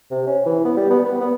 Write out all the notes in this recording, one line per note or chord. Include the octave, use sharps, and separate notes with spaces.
C3
C#4
E3
B3
G3
B3
B4
B3